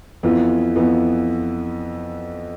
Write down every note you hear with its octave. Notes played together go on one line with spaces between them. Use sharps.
F2 E3 B3 F4
F2 E3 B3 F4